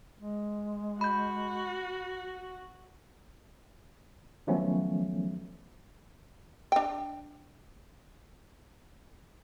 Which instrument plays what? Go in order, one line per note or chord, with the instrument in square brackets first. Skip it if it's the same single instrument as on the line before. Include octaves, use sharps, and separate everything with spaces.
[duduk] G#3
[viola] F#4 [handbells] B5 G6
[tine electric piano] D#3 F3 F#3 A3 B3 C#4
[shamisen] D4 G5